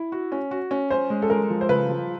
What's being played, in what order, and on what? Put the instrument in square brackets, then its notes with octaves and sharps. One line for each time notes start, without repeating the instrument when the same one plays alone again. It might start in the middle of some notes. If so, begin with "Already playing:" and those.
Already playing: [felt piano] E4
F#4
C#4
F#4
C#4
[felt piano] C#4 [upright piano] C5
[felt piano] G#3
[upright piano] A4
[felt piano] G#3 [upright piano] A#4
[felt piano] F3
[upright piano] C5
[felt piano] C#3 [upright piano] B4
[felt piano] F3